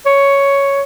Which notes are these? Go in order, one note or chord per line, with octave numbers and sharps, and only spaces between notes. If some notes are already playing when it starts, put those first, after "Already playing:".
C#5